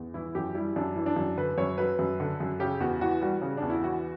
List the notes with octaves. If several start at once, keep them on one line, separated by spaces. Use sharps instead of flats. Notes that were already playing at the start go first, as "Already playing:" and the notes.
Already playing: E2
E3 E4
F#2 G4
G3 E4
F#2 D4
E3
D4
F#2
D3 B4
F#2 C#5
F#3 B4
F#2
D3
F#2
C#3 G4
E2 F#4
E3 F#4
G3 F#4
C#3
E2 D4
E4
E3 F#4